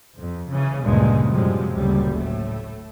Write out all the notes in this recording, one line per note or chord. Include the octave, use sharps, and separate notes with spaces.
F2
C#3 E3 C#4
D2 G2 A#2 C#3 G#3
F#2 A2 C3 F3 G3 G#3
F#1 D2 A#2 F#3 G3
A2 A3